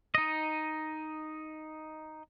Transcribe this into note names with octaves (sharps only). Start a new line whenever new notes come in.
D#4 D#5